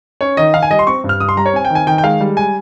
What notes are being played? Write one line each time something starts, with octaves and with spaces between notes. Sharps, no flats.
C#4 C#5
D#3 D#5
D#3 F5
G#5
G3 D#5
C6
C4 C#6
G2
F6
G2 D#6
C6
G3 A#5
C#5
C4 G#5
G5
D#3
G#5
D#3 G5
G5
G#3 F5
G3
G#5